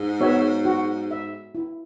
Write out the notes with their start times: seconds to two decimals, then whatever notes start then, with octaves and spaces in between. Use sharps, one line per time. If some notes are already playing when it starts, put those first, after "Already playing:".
Already playing: G#2
0.20 B3 F#4 C#5 E5
0.65 F#4
1.11 E5
1.55 E4